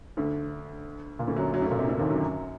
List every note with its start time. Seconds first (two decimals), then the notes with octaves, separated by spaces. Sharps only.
0.17 D2 D3
1.19 A#2
1.27 D2 D3
1.36 F#2 F#3
1.54 F#2 F#3
1.62 D2 D3
1.71 A#2
1.79 C3
1.88 D2 D3
1.99 D#2 D#3
2.10 F#2 F#3